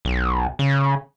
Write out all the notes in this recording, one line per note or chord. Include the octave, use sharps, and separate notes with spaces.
B1
C#3